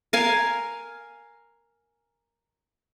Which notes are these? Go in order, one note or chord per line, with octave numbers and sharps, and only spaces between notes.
A#4 F5 G#5